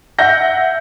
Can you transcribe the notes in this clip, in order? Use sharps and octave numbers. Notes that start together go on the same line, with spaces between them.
E5 F#5 G6 A#6